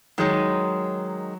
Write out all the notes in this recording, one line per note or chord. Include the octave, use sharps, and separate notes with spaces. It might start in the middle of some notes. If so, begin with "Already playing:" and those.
D#3 F#3 G#3 D#4